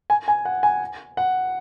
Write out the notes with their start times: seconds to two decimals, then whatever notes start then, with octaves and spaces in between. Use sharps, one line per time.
0.10 G#5
0.28 G#5
0.45 F#5
0.63 G#5
1.17 F#5